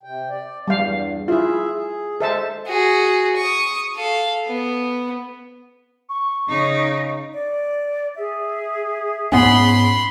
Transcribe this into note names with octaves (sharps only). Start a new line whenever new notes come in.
C3 G5
D5
E2 G2 G3 F5
E4 F4 G#4 E5
G#4
G#3 A4 C5 E5 A5
F#4 G#4
C#6 D#6
A4 F5
B3
C#6
C#3 D#4
D5
G#4 E5
G#2 B3 C#4 B5 C6